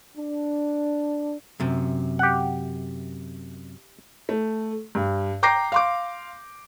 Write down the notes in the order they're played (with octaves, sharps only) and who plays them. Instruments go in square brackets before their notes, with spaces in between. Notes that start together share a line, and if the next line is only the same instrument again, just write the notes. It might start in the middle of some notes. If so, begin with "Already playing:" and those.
[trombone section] D4
[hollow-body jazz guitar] F#2 C3
[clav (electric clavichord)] G4 F#5
[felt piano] A3
G2
G5 A#5 D6 G6 A#6 C7
F5 C6 D6